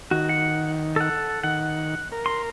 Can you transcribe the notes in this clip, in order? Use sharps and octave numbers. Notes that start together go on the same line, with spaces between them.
D#3 F#4
F#5
A4 F#5
D#3 F#5
A#4
C6